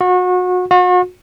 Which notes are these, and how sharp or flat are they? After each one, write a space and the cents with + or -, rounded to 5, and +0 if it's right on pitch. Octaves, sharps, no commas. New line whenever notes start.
F#4 -30
F#4 -40